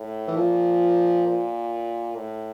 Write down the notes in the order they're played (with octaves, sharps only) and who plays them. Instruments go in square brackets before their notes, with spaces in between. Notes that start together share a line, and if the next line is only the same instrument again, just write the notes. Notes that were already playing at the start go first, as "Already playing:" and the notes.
Already playing: [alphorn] A2
[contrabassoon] E3
[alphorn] A#2 [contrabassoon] F3
[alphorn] A#2
A2